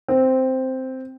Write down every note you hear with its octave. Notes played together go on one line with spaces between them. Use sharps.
C4